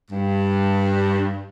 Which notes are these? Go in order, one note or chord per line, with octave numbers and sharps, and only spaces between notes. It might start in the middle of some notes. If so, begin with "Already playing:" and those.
G2